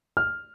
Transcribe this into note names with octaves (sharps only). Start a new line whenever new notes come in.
F6